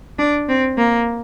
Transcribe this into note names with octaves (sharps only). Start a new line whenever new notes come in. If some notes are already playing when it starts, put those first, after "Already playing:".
D4
C4
A#3